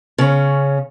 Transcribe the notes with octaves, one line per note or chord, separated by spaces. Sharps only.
C#3 C#4